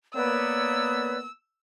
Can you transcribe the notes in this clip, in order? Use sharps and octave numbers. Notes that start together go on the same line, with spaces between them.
A#3 B3 B4 C#5 D5 E6